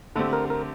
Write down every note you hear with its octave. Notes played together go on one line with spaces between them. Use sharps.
D3 A3 C4 G4 A4
A#4
A#4